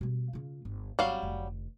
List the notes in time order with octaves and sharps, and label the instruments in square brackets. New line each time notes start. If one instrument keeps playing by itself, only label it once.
[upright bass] B2 G3
C#3 F4
G1
[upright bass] G1 C4 [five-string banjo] F#3 G3 F5
[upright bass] F1 D3